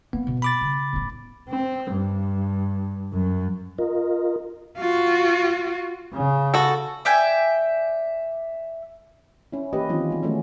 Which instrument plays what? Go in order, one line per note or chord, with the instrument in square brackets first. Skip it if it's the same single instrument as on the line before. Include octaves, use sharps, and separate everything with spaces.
[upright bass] A#3 [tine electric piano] B3
[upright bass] B2
[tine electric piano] B5 D6 A6
[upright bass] C#3
A1 E2
[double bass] C4
G2
F#2
[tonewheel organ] F4 A#4 D#5
[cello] F4 F#4
[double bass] C#3
[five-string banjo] F#4 A4
[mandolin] D5 E5 G5 G#5
[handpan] C#4 E4
E3 A#3 C#4 G4 B4 D#5
D#3 E3 F#3 C4 C#4 F4
G#3 B3
D#3 F#3 A3 B3 C#4